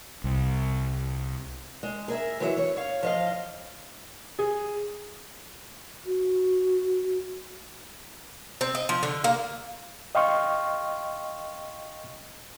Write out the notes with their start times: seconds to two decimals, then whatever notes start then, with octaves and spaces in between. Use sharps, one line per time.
0.24 C2
1.83 G#3
2.08 G#4 A#4 E5
2.40 E3 F#3 G#3 F#4 E5
2.57 C#5
2.77 C#5 F5
3.03 F3 D#5 F5
4.39 G#4
6.06 F#4
8.61 C4
8.75 D#5
8.89 F3
9.03 D3
9.24 A#3
10.15 D#5 F5 G5 C6 C#6 F6